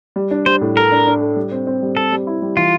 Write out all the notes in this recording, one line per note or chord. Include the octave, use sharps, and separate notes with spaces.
G3
D4
G3 C5
A2
A4 A#4
D4
D4
A4
G3
C4
C4
G3
C4 A4
G3
E4
G3
E3 F4